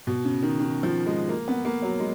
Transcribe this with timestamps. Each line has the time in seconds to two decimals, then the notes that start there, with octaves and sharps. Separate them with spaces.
0.07 B2
0.25 C#3
0.42 D#3
0.60 D#3
0.83 F3
1.06 G#3
1.29 A#3
1.48 B3
1.65 A#3
1.82 F#3
1.99 G#3